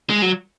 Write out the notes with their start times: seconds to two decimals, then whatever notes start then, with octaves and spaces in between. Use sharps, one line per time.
0.10 G#3
0.22 F#3